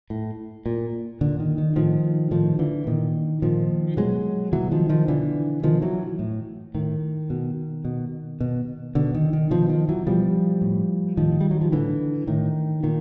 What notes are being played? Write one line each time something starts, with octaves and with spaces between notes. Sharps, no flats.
A2
A#2
A#2 D3
D#3
D#3
A2 D#3 F3
A2 D#3 F3
D3 E3
A#2 D#3
A#2 D#3 F3
B2 F#3 G#3
B2 E3 F#3
D#3 F3
D#3 F3
B2 D3 E3
B2 D#3 F3
E3 F#3
A2
A2 D#3
B2
B2
B2
B2 D3
D#3
D#3
B2 D#3 F3
D#3 F3
E3 F#3
B2 F3 G3
A2
A2 D#3 F3
G3
F#3
F3
A2 D3 E3
A2 D#3
A#2 D#3